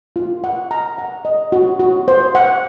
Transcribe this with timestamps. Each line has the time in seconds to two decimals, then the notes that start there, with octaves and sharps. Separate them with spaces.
0.16 F4
0.44 F#5
0.71 A#5
0.98 F#5
1.25 D#5
1.52 F#4
1.80 F#4
2.08 C5
2.35 F#5